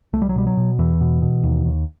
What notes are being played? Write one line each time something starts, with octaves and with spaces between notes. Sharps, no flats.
C2 A3
G3
F#3
B2 G3
F#3
B2
E2 E3
B2
B2
D#2
D#2